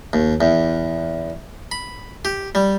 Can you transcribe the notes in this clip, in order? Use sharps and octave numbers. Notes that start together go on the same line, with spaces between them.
D#2
E2
B5
G4
G3